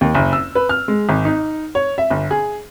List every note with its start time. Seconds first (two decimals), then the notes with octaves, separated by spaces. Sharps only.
0.01 D#2
0.15 F#1
0.33 E6
0.55 B4
0.69 F6
0.88 G#3
1.09 G#1
1.25 D#4
1.75 C#5
1.98 E5
2.10 G1
2.31 G#4